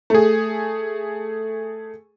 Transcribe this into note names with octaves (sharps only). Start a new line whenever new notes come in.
A3 G#4